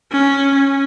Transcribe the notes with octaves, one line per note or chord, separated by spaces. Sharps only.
C#4
C#4